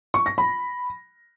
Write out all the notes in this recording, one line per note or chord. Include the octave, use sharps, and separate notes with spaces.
C#6
A#6
B5